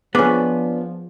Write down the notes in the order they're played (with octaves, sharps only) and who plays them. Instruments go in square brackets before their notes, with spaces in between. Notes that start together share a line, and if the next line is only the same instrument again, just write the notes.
[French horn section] F3 [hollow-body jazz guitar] B3 [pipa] C#4 D4 [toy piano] G#4 D6